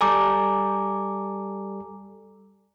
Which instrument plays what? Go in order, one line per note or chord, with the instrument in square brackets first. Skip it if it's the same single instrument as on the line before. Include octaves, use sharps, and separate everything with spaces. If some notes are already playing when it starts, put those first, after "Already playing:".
[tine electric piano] G3 A4 [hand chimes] G#5 A#5 D6